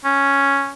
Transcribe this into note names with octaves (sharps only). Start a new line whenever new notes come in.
C#4